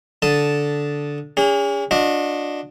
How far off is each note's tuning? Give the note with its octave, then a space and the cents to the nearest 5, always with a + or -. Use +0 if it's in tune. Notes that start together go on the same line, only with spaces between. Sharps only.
D3 -10 A5 +0 D#6 +0
C#4 +40 G#4 -30
D4 +0 F#4 -40 D#5 -5